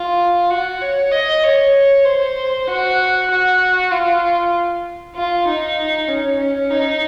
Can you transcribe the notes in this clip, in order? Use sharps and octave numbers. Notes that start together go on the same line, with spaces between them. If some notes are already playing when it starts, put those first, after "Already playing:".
Already playing: F4
F#4
C#5
D#5
C#5
C5
F#4
F#4
F4
F4
D#4
C#4
C#4
D#4